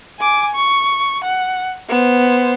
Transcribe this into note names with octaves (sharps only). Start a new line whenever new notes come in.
G#5 D6
C#6
F#5
B3 C5